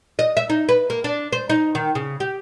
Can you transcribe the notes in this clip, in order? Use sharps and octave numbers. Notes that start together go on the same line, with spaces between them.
D#5
E5
D#4
B4
A#3
D4
C5
D#4
D#3
C#3
G4